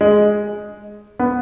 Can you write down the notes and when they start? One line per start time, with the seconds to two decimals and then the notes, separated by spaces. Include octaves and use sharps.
0.01 G#3
1.19 B3